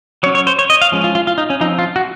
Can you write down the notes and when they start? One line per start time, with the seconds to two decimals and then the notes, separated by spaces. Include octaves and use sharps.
0.23 F#3 C#4 C#5
0.35 C#5
0.47 C5
0.59 C#5
0.70 D#5
0.81 F5
0.92 F3 G#3 C#4
1.04 F4
1.15 F4
1.27 F4
1.38 D#4
1.50 C#4
1.61 F3 C4 D#4
1.79 F4
1.96 F#4